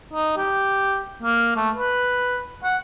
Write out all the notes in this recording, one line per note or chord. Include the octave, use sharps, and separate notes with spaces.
D#4
G4
A#3
A3
B4
F#5